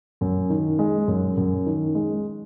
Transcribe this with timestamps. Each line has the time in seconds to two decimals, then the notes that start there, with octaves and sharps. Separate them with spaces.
0.21 F#2
0.50 D#3
0.79 G#3
1.08 F#2
1.37 F#2
1.66 D#3
1.95 G#3